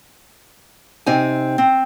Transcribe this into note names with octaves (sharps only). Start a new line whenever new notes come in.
C3 C4 D#4 G#5
C4